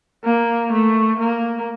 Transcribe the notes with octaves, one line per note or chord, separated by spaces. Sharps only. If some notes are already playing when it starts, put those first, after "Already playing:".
A#3
A3
A#3